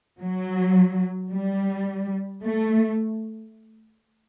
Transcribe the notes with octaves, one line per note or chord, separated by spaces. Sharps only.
F#3
G3
A3